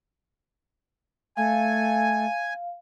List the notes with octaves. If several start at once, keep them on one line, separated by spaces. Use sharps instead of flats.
A3 F5 G#5